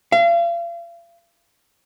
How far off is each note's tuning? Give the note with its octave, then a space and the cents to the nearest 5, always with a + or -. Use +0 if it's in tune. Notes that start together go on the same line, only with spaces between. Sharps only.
F5 -40